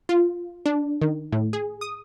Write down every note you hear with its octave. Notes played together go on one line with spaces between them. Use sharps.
F4
D4
D#3
A2
G#4
D#6